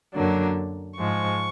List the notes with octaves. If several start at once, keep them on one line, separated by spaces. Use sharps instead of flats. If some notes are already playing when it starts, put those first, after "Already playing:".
F#2 D3 F#3 A#3 D4
G#2 F3 G#3 C#6